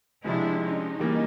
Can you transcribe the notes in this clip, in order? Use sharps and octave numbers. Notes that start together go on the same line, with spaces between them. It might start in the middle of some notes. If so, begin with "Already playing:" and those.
C3 F3 G#3 D4 E4
C#4 D#4
E3 G3 A#3